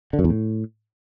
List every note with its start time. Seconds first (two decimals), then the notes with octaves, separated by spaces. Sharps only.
0.13 D3
0.19 F#2
0.24 E2
0.30 A2